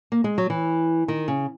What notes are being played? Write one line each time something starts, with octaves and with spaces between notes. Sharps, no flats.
A#3
G#3
F#3
E3
D#3
C#3